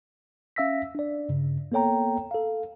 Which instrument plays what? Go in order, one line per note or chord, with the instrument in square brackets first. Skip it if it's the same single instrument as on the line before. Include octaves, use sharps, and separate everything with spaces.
[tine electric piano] C#4 E5 F5 E6 A#6 B6
D4 D5
G2 C#3
A#3 B3 A4 C#5 G5 A#5
A4 F5